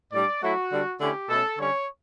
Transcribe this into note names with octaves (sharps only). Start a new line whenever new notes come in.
A2 G3 D4 D5
F#3 A3 E4 F#4
D3 G3 D4
D3 A3 C#4 E4 G4
B2 A3 C#4 A4
D3 G3 C#4 C#5